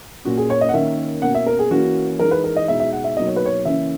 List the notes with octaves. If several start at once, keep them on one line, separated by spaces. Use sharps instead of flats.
A#2 A#3 C#4 F#4
G#4
C#5
D#5
F#5
D#3 A#3 C#4 E5
B2 A#3 C#4 F#5
E5
A#4
G#4
E3 A#3 C#4 F#4
E3 G#3 D#4 A#4
B4
A#4
D#5
B2 G#3 D#4 E5
E5
F#5
E5
B2 F#3 A#3 D#4 D#5
C#5
B4
C#5
C#3 E3 A#3 C#4 E5